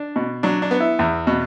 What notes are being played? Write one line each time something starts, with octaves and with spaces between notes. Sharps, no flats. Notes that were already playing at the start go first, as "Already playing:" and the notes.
Already playing: D4
B2
F#3 D4
D4
B3
E4
E2
B2